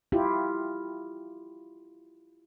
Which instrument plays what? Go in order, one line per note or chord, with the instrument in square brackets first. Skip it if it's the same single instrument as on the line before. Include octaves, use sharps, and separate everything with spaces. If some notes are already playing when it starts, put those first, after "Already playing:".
[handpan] E4 F4 G4